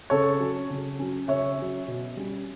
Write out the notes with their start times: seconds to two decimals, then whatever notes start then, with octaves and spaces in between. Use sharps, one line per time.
0.10 C#3 A4 C#5
0.40 F#3 C#4
0.70 C#3
0.99 F#3 C#4
1.28 C#3 C#5 E5
1.58 F#3 C#4
1.88 B2
2.17 G3 C#4